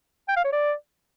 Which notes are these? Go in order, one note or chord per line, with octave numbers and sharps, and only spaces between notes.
G5
F5
C#5
D5